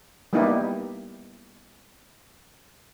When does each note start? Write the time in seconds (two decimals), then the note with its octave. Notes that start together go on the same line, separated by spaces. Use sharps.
0.33 G3 A#3 B3 D#4 E4 G4